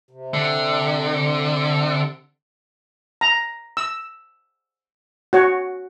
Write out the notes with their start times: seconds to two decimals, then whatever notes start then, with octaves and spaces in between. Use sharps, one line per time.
0.11 C3
0.34 D3
3.21 A#5
3.77 E6
5.33 F#4 C#5